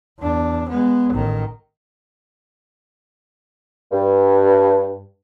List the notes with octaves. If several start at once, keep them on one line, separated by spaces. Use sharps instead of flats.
E2 D4
G#3 B3
A1 D#3
G2